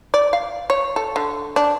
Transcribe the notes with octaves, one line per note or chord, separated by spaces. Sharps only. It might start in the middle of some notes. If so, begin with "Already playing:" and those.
D5
F5
C#5
A4
D3
D4